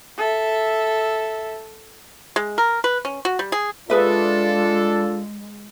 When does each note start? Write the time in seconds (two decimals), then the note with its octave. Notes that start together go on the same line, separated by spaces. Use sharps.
0.17 A4 E5
2.36 G#3
2.58 A#4
2.84 B4
3.05 C#4
3.25 F#4
3.39 G3
3.52 G#4
3.90 G#3 D4 F4 G#4 A4 B4 E5